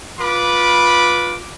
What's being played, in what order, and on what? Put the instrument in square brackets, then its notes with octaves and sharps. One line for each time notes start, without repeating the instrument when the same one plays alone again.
[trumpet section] F4 B4 B5 D6